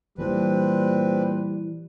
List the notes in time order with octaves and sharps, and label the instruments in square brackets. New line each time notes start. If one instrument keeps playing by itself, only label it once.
[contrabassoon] A#2 [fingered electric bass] E3 [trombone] G3 [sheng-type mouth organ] C4 D4 B4